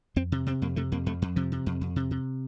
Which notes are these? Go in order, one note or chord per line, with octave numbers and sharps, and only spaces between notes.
F2 C4
C3
C3 C4
F2 A#3
C3 A3
F2 A#3
F2 A3
F2
C3 F3
C3
F2
F2
C3
C3